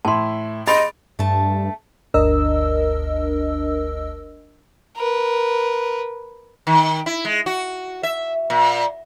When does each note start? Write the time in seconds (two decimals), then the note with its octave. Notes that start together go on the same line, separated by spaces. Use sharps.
0.05 A2 E4 A5 C6
0.68 G#4 D#5 B5 C6 A6 D7
1.19 G2 A3 A5
2.14 G1 D2 D4 A#4 D#5 E6
4.96 A#4 B4
6.67 D#3
7.06 E4
7.25 G#3
7.46 F#4
8.03 E5
8.50 A#2